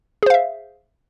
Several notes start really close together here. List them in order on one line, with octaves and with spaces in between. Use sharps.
G#4 C5 F5 E5